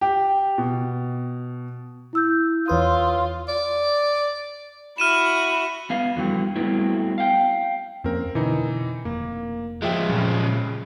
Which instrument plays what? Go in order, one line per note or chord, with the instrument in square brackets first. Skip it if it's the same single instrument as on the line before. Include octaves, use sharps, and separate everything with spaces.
[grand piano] G4
B2
[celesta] E4 E6 G6
[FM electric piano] E2 B4 D#6 [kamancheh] F4 [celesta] C#5 C6
[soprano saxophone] D5
[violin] E4 F#4 [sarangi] B5 [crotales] F6 D#7 E7
[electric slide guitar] B3 F5
F2 D3 E3 F#3 G3
F#3 G3 A3 B3 C4 E4
F5 G5
[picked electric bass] F2 A#3 C#4 [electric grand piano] C4 A#4
[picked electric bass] B2 D3 D4 [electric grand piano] E3 D#4
[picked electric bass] F1 [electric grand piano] A#3
[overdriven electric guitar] F3 G#3 [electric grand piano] F4 E5 G5
[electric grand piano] F2 C#3 [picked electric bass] A#2 F#3